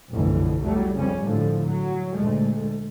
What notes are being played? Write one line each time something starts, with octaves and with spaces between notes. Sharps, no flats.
F1 B1 F#2 B2 D3 E3
E2 F#3 G3 A3
F2 C#3 G3 C#4
A2 D3 F3 A3
F#3
D2 A#2 G#3 A3